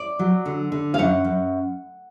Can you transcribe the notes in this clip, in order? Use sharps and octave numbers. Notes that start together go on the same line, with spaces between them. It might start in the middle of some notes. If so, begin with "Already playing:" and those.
Already playing: D5
F#3
D3
D3
F5
F#2 F#5
F#2